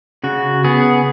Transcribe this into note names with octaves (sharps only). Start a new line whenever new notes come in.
C#3 F#4
B3 G#4